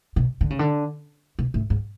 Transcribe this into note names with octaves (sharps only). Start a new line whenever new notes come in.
B2
D3
C#3
D3
B2
A2
G#2